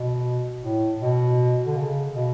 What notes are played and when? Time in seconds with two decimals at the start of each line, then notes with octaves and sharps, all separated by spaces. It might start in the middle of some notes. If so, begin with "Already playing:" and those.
Already playing: B2
0.64 A2
1.01 B2
1.66 D3
1.77 C#3
2.14 B2